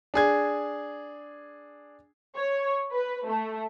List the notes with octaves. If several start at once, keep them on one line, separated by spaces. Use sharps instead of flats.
D4 G#4 G#6
C#5
B4
A3